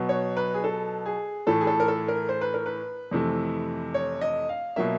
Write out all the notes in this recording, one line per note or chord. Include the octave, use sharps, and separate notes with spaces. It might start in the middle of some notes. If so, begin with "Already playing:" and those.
Already playing: B2 F#3 B3
C#5
B4
G#4
A4
G#4
A2 E3 A3 A4
G#4
A4
A#4
A4
A#4
C5
B4
A#4
B4
F2 C3 E3 A3
C#5
D#5
F5
B2 F#3 A#3 E5